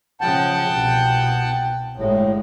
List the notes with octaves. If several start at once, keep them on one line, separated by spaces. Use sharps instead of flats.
C#3 F3 F#5 G5 A5
C2 B2
G1 A2 G#3